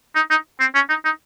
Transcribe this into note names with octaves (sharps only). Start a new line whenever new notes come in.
D#4
D#4
C4
C#4
D#4
D#4